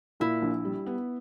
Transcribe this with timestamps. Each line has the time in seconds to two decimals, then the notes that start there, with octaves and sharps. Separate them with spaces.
0.20 A#2 E4
0.42 A#1
0.65 G3
0.86 B3